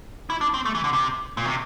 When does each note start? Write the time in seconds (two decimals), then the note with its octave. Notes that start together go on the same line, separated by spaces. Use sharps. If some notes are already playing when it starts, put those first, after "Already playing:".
0.30 E4
0.41 D4
0.54 C4
0.65 A3
0.75 E3
0.84 D3
0.93 C3
1.37 A#2
1.45 C3